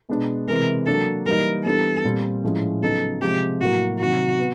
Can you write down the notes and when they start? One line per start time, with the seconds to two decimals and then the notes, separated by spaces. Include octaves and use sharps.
0.09 B2 G#3 B3 D4
0.48 C3 E3 G#3 A#4
0.86 F#3 A#3 D4 A4
1.26 E3 G3 A#3 D#4 A#4
1.65 E3 G3 B3 D4 A4
2.04 A#2 G3 C4
2.43 A2 F3 G#3 C#4
2.83 C#3 F#3 B3 D#4 A4
3.21 C3 F3 G#3 G4
3.60 A2 F#3 A#3 F#4
4.00 C3 D#3 F#3 F#4
4.39 B3